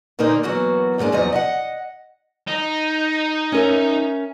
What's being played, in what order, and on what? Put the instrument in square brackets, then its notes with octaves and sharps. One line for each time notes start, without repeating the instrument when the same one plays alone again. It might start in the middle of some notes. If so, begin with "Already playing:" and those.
[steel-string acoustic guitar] A#2 D3 A#3 D#4 A#4 C5
E3 F#3 A#3 B3 F#4
D#2 G#2 G#3 A#3 D4
E2 F3 F#3 D#4 D#5
D#5 E5 F#5
[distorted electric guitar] D#4
[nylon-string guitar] C#4 A#4 E5